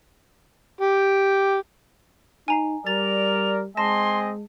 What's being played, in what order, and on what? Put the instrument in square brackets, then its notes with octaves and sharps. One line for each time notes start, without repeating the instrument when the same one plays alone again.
[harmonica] G4
[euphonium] D#4 [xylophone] G#5 A#5 C7
[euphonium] G3 [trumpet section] A#4 D5 [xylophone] A6 [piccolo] F7
[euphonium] G#3 [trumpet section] C4 D#5 G#5 [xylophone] A5 A#6 [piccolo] C6